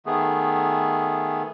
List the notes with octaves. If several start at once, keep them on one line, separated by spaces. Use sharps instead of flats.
D#3 A3 B3 G#4